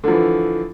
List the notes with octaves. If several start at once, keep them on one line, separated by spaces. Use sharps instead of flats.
D3 E3 F3